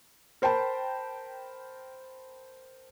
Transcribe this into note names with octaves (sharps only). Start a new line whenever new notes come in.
A#4 C5 G5 A5 B5